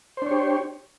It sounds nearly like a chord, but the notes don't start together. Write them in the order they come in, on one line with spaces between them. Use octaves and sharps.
C5 D4 C#5 G4